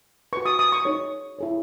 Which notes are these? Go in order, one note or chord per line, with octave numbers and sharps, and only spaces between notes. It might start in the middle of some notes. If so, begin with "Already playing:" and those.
F#4 B4 C#6
D#6
D#6
C#6
D#4 G#4 C#5
E4 G#4 C#5